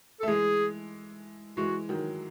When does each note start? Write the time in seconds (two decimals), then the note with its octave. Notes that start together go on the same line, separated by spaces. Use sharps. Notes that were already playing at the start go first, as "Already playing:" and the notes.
0.20 A4
0.23 A3
0.27 E3 G#3 G#4
1.57 E3 G#3 F#4
1.89 D#3 F#3